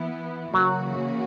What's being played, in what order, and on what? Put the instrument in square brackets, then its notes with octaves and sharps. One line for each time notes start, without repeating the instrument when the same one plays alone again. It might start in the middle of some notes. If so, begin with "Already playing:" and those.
Already playing: [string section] E3 B3 E4
[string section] C#3 E3 A#3 C#4 F#4 [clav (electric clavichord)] F#3